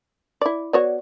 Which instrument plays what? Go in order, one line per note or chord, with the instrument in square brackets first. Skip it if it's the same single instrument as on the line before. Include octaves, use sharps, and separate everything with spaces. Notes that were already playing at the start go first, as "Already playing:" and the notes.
[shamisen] E4 D5
[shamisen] B3 F#4 C#5 [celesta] D5